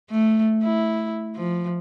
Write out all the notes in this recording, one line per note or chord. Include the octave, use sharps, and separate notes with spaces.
A3
E4
F3